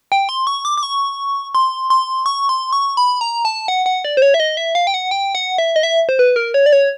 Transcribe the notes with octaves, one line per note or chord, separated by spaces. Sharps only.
G5
C6
C#6
D6
D6
C#6
C6
C6
C#6
C6
C#6
B5
A#5
A5
F#5
F#5
D5
C5
C#5
E5
D#5
E5
F5
G5
F#5
G5
F#5
E5
D#5
E5
C5
B4
A#4
C#5
D5
C#5